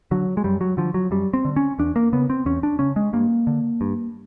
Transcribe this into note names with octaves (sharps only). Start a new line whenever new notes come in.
D3 F#3
G#3
F#2 G3
F#3
D3 F3
F#3
F#2 G3
C4
D3
C#4
E2 D4
A#3
C#3 B3
C4
E2 C#4
D4
C#3 C#4
G#3
G2 A#3
D3
G2